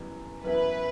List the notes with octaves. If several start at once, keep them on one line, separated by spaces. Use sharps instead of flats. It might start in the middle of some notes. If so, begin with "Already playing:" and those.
Already playing: F#2 E3 G3 B3
F#2 E3 B3 E4 B4